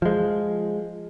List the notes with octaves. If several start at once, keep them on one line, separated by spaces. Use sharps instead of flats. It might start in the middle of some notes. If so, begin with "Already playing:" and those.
F3 G#3